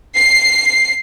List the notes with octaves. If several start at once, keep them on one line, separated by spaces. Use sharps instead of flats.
C7